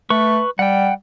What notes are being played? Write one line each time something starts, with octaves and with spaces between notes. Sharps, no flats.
A3 B4 C#6
G3 F#5 G5